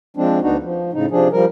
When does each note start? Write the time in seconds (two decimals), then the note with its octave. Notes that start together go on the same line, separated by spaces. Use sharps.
0.17 F3 G#3 C4 D4
0.42 D2 B3 D4 D#4 F#4
0.63 F3
0.93 A2 C#3 D#4
1.11 C3 F3 D4 G#4
1.32 F3 G3 A#4